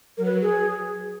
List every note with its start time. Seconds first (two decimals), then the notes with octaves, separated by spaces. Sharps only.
0.17 F#3 A#4
0.25 B4
0.42 G#4